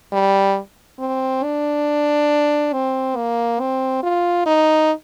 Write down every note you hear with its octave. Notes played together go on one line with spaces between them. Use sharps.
G3
C4
D4
C4
A#3
C4
F4
D#4